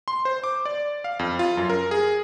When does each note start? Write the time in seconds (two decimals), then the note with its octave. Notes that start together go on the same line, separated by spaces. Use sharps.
0.08 C6
0.25 C5
0.44 D6
0.65 D5
1.04 F5
1.19 F2
1.39 F4
1.57 F#2
1.70 A#4
1.91 G#4